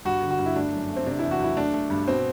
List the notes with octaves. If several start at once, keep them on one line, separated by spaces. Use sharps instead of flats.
G2 F#4
D3
F#4
G2
E4
A3 D4
F#2
A3
C4
C3 D4
E4
E2
F#4
F#3 E4
A3 D4
A3
G2
B2 C4